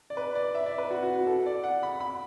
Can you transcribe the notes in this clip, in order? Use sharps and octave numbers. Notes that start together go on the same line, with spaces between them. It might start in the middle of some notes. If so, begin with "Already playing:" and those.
D5
B4
D5
E5
D5
B4
F#4
F#4
F#4
A4
D5
F#5
B5
B5